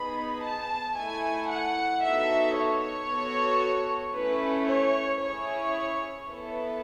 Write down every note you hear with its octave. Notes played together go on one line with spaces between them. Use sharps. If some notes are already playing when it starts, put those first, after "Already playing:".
Already playing: B3 D#4 G#4 B5
A5
A3 E4 A4 G#5
F#5
B3 D#4 F#4 A4 E5
C#5
B3 F#4 A4
A3 C#4 E4 B4
C#5
C#4 E4 G#4 C#5
B3 E4 A4 B4